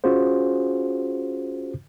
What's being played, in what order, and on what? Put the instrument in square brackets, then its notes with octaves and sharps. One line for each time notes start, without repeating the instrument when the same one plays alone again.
[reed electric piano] C#4 F4 F#4 G#4 C5